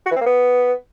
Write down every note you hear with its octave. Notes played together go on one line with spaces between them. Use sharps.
F#4
E3
C4
A#3
B3